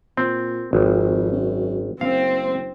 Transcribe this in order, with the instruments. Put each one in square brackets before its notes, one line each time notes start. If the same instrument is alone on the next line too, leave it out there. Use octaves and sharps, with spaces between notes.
[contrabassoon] A#2 [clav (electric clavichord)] C4
[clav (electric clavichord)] G#1 [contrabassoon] F2
[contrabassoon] F#2
[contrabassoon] F#1 [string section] C4 [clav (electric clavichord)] F5